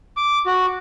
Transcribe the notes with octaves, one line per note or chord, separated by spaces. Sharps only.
D6
F#4